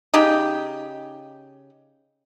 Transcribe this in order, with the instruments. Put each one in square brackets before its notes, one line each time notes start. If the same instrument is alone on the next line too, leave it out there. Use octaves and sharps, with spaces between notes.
[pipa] C#3 D#4 G4 G5